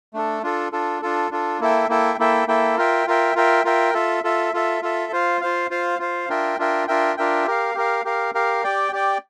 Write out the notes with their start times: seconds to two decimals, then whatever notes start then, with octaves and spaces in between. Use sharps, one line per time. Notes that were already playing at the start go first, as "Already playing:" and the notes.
0.14 A3 D4 A4
0.43 D4 F4 A4
0.72 D4 F4 A4
1.02 D4 F4 A4
1.31 D4 F4 A4
1.60 A#3 E4 A4 E5 G5
1.89 A#3 E4 A4 E5 G5
2.19 A#3 E4 A4 E5 G5
2.48 A#3 E4 A4 E5 G5
2.78 F4 A#4 E5 G5
3.07 F4 A#4 E5 G5
3.35 F4 A#4 E5 G5
3.65 F4 A#4 E5 G5
3.94 F4 A4 E5
4.24 F4 A4 E5
4.54 F4 A4 E5
4.82 F4 A4 E5
5.12 F4 C5 F5
5.41 F4 C5 F5
5.70 F4 C5 F5
5.99 F4 C5 F5
6.29 D4 F4 A#4 E5 G5
6.58 D4 F4 A#4 E5 G5
6.87 D4 F4 A#4 E5 G5
7.17 D4 F4 A#4 E5 G5
7.47 G4 A#4 F5
7.75 G4 A#4 F5
8.05 G4 A#4 F5
8.35 G4 A#4 F5
8.64 G4 D5 G5
8.92 G4 D5 G5